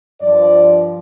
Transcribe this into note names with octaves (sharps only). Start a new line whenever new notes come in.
G2 F3 D5